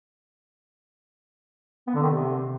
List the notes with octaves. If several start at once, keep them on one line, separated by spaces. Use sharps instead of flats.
B3
D3
D#3
C3